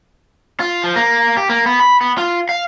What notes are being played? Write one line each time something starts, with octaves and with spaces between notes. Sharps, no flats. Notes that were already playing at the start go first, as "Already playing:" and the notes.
F4
F3
A#3
G4
A#3
B3
B5
B3
F4
F5